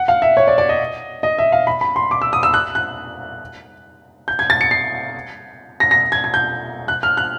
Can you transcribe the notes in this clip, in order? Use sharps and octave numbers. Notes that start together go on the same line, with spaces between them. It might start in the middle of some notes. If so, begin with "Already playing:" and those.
Already playing: F#5
F5
E5
C#5
D5
D5
D#5
D#5
E5
F5
B5
B5
C6
D6
E6
D#6
E6
F#6
F#6
G6
G#6
A6
C#7
C7
A#6
A#6
G#6
G#6
G6
F#6
F6
F#6